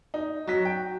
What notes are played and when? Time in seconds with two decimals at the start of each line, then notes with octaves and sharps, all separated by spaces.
0.14 D#4
0.47 F#3 F#4 B6
0.65 G5